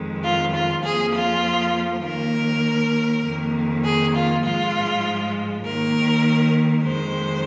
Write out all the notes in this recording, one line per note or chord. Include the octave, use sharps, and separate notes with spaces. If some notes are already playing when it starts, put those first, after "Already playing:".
Already playing: F2 D#3 G#3
F4
F4
F2 F3 A#3 G#4
F4
D#2 D#3 A#3 A#4
F2 D#3 A#3
G#4
F4
G#2 F3 G#3 F4
D#2 D#3 A#3 A#4
F2 D#3 G#3 C5